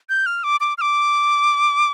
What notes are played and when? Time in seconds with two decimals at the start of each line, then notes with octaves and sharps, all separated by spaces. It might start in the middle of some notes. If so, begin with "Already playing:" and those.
0.09 G6
0.26 F6
0.44 D6
0.60 D6
0.78 F6
0.81 D6